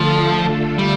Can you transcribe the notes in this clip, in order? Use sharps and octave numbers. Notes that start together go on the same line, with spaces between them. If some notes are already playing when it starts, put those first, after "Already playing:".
Already playing: D3 F3 A3 D4 F4 A4
G3